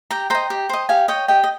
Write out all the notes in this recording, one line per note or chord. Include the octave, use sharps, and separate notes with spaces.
G4 G5 A#5
C5 D#5 G5 A#5
G4
C5 D#5
G4 F5 G#5
C#5 D#5 G5
G4 D#5 G5
D#5